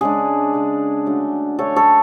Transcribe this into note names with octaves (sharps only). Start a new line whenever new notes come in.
C#3 G#3 D4 G#4
C#3 G#3 D4
D3 F#3 A3
D3 F#3 A3 A4 C#5
A4 C#5